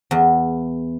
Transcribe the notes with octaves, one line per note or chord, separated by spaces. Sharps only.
E2